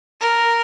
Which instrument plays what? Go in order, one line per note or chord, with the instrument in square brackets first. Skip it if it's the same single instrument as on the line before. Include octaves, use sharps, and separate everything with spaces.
[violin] A#4